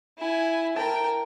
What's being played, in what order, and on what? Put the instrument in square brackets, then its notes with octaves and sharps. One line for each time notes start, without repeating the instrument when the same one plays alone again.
[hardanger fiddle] E4 G#5
[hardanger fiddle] A#4 G5 [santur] A5 A#5